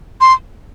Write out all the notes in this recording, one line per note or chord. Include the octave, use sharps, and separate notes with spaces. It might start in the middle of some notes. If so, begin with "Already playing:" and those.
C6